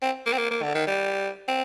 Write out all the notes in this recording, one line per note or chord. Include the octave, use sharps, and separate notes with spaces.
C4
A#3
C4
A#3
A#3
D3
D#3
G3
C4